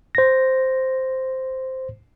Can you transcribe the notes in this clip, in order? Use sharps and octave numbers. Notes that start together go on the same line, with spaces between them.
C5 A#6